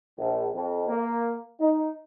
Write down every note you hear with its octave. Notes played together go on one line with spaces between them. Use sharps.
A#1
F2
A#3
D#4